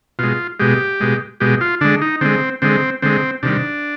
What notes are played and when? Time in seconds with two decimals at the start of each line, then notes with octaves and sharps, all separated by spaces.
0.19 B2 G#3 F4
0.60 B2 G#3 G4
1.00 B2 G#3
1.40 B2 G#3 G4
1.61 F4
1.81 D3 G#3 D4
2.02 D#4
2.21 D3 G#3 C4
2.62 D3 G#3 C4
3.02 D3 G#3 C4
3.43 C3 D#3 G3 D4